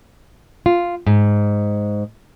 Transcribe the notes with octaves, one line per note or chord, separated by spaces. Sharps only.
F4
G#2